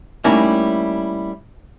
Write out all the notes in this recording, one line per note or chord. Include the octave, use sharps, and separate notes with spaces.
G3 A3 A#3 C#4 D#4 E4